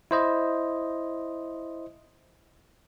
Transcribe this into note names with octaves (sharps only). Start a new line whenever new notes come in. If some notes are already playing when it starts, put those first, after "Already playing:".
E4 C5 D#5